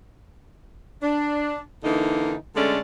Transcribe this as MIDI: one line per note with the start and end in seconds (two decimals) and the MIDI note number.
1.03 1.58 62
1.84 2.34 50
1.84 2.34 52
1.84 2.34 58
1.84 2.34 63
2.55 2.78 50
2.55 2.78 56
2.55 2.78 57
2.55 2.78 61
2.55 2.78 74